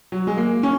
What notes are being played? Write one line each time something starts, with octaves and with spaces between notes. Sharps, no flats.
F#3
G#3
A#3
C#4